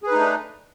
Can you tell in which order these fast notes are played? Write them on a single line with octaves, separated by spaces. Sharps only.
G#4 B4 D#4 A3 D4